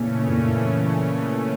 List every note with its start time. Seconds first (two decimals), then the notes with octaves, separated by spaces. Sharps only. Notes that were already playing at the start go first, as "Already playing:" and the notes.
Already playing: A#2 C#3 E3 A3 A#3 C#4
0.28 A#2 A#3